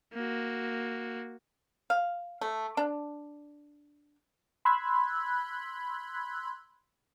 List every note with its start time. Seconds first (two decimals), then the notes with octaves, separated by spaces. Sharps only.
0.13 A#3 F#4
1.90 F5
2.41 A3
2.77 D4
4.65 B5 C6 E6 F#6 G#6 B6